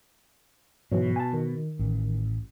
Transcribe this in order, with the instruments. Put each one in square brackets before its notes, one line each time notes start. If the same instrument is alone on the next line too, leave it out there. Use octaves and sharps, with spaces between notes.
[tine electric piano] G#2 E3 F#3 [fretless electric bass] B2
[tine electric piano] G#5 A5
D#3
[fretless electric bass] A1